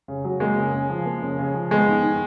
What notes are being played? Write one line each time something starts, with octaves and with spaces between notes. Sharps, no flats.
C#3
F#3
G#3 A#3
C#3
C#3
F3
A#3
C#3
C#3
F3
G#3 B3
D#3
D#3